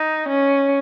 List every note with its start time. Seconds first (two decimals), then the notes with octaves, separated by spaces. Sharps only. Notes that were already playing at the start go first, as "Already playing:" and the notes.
Already playing: D#4
0.28 C#4